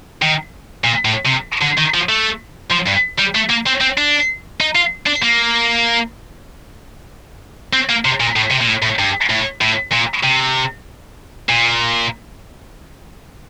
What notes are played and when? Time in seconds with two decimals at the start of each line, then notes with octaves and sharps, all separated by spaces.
0.22 D#3
0.84 A#2
1.05 A2
1.26 C3
1.62 D3
1.78 D#3
1.94 F3
2.09 A3
2.71 F3
2.87 G2
3.19 G3
3.35 A3
3.50 A#3
3.66 C4
3.81 C4
3.98 D4
4.61 D#4
4.75 F4
5.07 D4
5.23 A#3
7.73 C4
7.89 A#3
8.05 C3
8.20 A#2
8.36 A2
8.51 C3
8.61 A#2
8.67 A2
8.82 A2
8.99 G2
9.30 A2
9.61 A2
9.92 A#2
10.23 C3
11.49 A#2